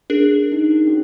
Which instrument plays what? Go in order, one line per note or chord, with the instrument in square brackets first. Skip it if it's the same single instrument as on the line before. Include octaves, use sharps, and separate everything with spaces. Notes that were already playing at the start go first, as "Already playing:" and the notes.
[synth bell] D4 G#4 A#4
[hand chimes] D#4
C#4 F#4